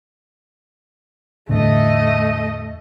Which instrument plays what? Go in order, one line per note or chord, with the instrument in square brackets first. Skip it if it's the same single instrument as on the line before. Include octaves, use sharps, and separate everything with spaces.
[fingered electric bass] E2 A2 D3 [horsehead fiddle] A3 D#5